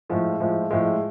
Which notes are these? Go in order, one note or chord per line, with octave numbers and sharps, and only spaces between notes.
A2 F3 G#3
A2 F3 G#3
A2 F3 G#3